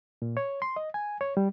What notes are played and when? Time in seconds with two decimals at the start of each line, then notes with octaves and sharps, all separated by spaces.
0.22 A#2
0.37 C#5
0.62 C6
0.76 D#5
0.94 G#5
1.21 C#5
1.37 G3